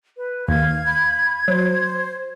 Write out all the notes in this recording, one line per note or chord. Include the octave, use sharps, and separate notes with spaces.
B4
D#2 F5 G#6
B5
F#3 C5